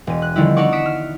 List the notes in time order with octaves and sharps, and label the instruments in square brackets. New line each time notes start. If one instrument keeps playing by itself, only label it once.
[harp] E1 D#7
F#6
D3 D#3 F3 G3 D#4 E4
D4 D#4 D5 F#5 C#6 D6
D#6 B6 C#7 D7 E7
F6